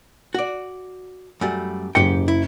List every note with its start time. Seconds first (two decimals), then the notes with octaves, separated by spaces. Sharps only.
0.35 F#4 D5
1.41 F#2 G3 A3
1.95 F#1 G#2 G4 G5 C#7
2.28 E4